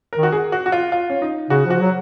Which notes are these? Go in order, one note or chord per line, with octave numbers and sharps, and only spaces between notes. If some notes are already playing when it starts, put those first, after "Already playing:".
A#4
D#3
F#4
G#4
F#4
F#4
F4
F4
C#4
D#4
C#3 F#4
F3 F#4
F#3